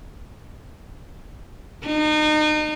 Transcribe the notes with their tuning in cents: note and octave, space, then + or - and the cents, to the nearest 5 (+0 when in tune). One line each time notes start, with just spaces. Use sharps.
D#4 -35